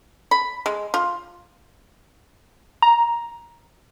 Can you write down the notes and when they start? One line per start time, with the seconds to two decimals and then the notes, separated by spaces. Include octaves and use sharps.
0.31 B5
0.66 G#3
0.94 F4
2.82 A#5